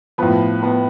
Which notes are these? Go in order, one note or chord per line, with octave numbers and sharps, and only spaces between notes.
A2 F3 B3 B4
B3 B4